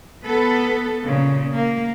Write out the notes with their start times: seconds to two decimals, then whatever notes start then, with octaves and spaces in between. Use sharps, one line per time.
0.25 B3 A4 B4
1.06 A#2 C#3
1.55 A#3